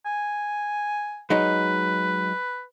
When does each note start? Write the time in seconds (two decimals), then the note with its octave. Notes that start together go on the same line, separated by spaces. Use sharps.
0.06 G#5
1.30 F#3 G#3 D#4 B4